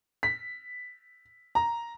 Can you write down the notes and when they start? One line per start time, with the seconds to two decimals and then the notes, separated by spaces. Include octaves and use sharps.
0.23 B6
1.55 A#5